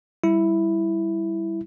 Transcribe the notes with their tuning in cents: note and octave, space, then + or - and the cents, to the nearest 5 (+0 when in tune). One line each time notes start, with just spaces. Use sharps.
G3 +0 E4 +0